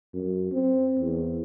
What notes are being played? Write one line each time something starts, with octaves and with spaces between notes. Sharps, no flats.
F#2
C4
E2